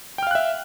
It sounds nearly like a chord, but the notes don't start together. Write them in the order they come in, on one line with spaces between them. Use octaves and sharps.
G5 F6 F5 F#6 E5